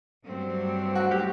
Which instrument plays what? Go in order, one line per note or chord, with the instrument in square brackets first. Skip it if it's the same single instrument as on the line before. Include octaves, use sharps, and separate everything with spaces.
[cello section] G2 F#3 A3 C4
[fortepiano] F#4
G4